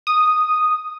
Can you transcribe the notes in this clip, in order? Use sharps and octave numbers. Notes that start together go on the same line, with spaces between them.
D#6